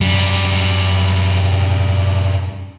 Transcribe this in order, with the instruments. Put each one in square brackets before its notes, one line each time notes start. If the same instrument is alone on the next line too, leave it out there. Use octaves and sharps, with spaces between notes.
[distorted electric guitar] F#2 G3